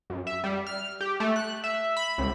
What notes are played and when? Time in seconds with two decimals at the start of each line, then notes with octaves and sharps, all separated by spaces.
0.10 F#2
0.27 E5
0.44 G3
0.67 F6
1.01 G4
1.20 A3
1.36 F#6
1.64 E5
1.97 B5
2.18 C#2